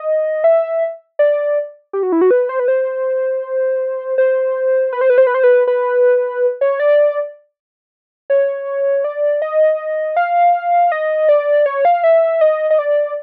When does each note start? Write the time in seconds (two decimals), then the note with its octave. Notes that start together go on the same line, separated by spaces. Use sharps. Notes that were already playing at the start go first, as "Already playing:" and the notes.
Already playing: D#5
0.44 E5
1.19 D5
1.93 G4
2.03 F#4
2.12 E4
2.21 F#4
2.31 B4
2.49 C5
2.59 B4
2.68 C5
4.18 C5
4.93 B4
5.01 C5
5.10 B4
5.18 C5
5.27 B4
5.34 C5
5.43 B4
5.68 B4
6.61 C#5
6.80 D5
8.30 C#5
9.04 D5
9.42 D#5
10.17 F5
10.92 D#5
11.29 D5
11.66 C#5
11.85 F5
12.04 E5
12.41 D#5
12.70 D#5
12.79 D5